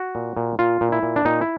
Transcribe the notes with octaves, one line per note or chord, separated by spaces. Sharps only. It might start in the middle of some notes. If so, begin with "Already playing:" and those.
Already playing: F#4
A#2
A#2
A#2 F4
A#2
E4
A#2
D4
A#2 D#4
E4